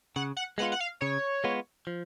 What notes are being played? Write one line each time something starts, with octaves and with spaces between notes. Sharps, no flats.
C#3 F#5
F#5
G#3 B3 F4 F#5
F#5
F5
C#3 C#5
G#3 B3 F4
F3